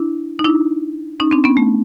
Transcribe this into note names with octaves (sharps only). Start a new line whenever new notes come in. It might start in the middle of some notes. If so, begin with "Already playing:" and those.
Already playing: D4 E4
D#4
D4 E4
C#4 D#4
C4 D4
B3 C#4
A3